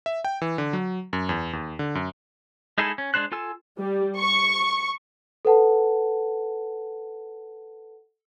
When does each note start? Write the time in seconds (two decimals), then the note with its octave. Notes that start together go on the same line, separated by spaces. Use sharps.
0.06 E5
0.25 G5
0.42 E3
0.58 D3
0.73 F#3
1.13 F#2
1.29 E2
1.53 D#2
1.79 D3
1.95 F#2
2.78 G#3 D#4 E4 G#4 A4
2.98 C#4
3.14 G#3 D4 C5 F#6
3.32 F4 A4 G#5 E6
3.78 G3
4.17 C#6
5.45 A4 B4 F#5 A5